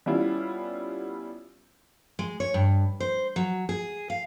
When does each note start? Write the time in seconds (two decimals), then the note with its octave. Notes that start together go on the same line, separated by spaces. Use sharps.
0.06 G3 B3 C#4 E4 F4
2.19 G#3
2.40 C#5
2.54 G2
3.00 C5
3.36 F#3
3.69 G#4
4.10 F5